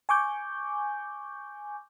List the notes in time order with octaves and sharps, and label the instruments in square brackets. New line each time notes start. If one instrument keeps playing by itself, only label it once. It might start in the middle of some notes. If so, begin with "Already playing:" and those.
[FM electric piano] G#5 C#6 D6 G6